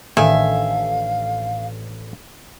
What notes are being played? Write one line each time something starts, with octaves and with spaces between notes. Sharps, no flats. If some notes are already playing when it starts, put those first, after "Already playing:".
A1 D#3 D4 A4 E5 F5 G#5